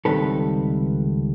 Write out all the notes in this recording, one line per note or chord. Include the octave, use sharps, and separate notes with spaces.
C#2 C3 D#3 G3 A4 B4